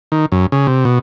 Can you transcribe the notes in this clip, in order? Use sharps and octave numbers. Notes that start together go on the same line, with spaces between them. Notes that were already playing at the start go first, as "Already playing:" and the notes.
D#3
F#2
C#3
C3
B2